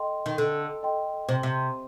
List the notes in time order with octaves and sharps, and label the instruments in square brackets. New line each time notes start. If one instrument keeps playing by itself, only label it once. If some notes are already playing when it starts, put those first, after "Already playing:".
Already playing: [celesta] A4 D#5 G5 C6
[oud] D#3
[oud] D3 [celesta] A4
[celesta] D#5 G5 C6
[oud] C3 [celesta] C5
[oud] C3